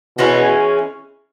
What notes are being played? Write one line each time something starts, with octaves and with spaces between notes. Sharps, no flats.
B2 E3 G#3 C#4